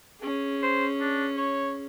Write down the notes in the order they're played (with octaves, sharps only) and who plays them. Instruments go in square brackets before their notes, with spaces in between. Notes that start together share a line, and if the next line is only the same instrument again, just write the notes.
[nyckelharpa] C#4 G#4
[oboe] C5
D4
C#5